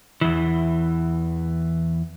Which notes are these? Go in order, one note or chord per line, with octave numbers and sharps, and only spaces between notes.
E2 E3